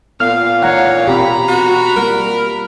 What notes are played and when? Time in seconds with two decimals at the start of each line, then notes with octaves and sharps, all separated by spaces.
0.20 A#2 B3 F5 F6
0.63 E3 A3 D#4 C#5 F5 F#5 A#5
1.08 B2 C4 G4 A#5 B5
1.48 F#4
1.96 G3 A#3 F4 A#4